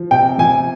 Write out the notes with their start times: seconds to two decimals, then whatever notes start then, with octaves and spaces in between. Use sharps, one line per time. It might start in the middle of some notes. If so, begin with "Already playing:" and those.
Already playing: F3
0.11 C3 G5
0.38 F3 G#5